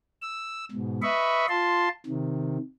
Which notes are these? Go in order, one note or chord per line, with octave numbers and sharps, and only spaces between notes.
E6
G#2 B2
B4 D#5 E5 B5 C#6
F4 A5 C6
C3 D#3